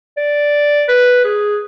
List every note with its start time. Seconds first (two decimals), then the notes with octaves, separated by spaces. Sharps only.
0.17 D5
0.88 B4
1.24 G#4